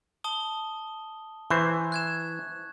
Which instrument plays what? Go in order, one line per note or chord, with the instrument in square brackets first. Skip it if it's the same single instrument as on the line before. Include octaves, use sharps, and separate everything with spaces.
[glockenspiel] A5 D#6 G7
[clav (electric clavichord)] E3 C5 [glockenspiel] C#6
[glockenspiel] F#6 G#6 E7